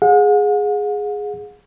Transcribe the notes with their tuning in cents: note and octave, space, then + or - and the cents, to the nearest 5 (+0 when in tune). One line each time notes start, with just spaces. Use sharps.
G#4 +0 F#5 -45